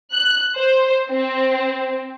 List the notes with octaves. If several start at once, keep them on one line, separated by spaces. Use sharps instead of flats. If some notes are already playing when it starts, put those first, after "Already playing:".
F#6
C5
C4